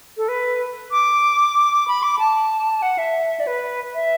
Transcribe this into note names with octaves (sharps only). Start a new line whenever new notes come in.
A4
B4
D6
B5
D6
A5
F#5
E5
D5
B4
E5